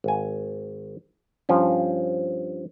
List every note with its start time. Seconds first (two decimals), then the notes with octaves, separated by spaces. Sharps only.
0.04 G#1 G#5
1.49 G2 F3 C#4